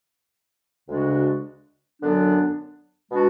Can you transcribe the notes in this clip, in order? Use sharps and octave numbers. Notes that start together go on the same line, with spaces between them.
D2 C#3 G#3 D4 F#4
F#2 D3 F#3 B3 D4
B2 G#3 D4 F#4